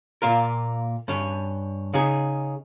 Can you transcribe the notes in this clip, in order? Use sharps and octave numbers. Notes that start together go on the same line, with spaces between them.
A#2 A#3 F4 A#4
G2 C#4
C#3 D#4 G#4